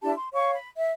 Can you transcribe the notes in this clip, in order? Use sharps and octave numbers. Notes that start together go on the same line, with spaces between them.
D4 E4 G4 A5
C6
C#5 F5 C#6
B5
E5